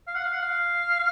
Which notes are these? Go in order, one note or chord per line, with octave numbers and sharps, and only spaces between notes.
F5
F#5
F5
F#5
F5